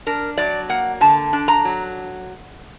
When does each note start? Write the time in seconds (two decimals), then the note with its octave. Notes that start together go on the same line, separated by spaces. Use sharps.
0.07 D4 A#4
0.38 F#3 D5
0.69 A#3 F#5
1.01 D3 A5
1.33 D4
1.48 A#5
1.65 F#3